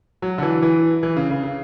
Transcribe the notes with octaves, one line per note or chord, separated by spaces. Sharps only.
F#3
D3
E3
E3
E3
C#3
C#3
C#3